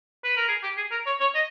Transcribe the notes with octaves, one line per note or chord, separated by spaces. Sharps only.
B4
A#4
G#4
G4
G#4
A#4
C#5
C#5
D#5